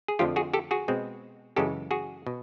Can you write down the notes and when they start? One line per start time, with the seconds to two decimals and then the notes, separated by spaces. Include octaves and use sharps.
0.08 G#4
0.19 F2 D3 F3 A3 F4 G4
0.36 F#4 G#4
0.54 G4 A4
0.71 F#4 G#4
0.88 B2 G#3 C4
1.56 F#2 C#3 E3 G#3 G4 A4
1.91 F#4 G#4
2.27 B2